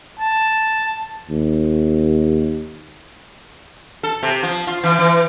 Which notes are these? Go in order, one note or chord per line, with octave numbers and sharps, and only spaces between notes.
A5
D#2
A4
C3
F3
F4
E3
E3